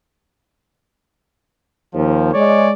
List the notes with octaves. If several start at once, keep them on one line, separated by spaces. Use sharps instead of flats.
D#2 F3
G#3 G#4 C#5 D5